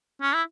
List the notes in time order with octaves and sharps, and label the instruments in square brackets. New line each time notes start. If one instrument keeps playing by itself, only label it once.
[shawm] C#4
E4